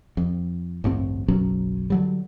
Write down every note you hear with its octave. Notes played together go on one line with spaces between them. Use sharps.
F2
A1 D2 G2 C4
F#1 B1 F#3 C#4
D3 F#3 G3